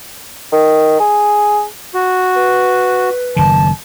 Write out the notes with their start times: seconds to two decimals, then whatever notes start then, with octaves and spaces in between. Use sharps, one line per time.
0.52 D#3
1.00 G#4
1.94 F#4
2.36 B4
3.36 F#1 D#3 A5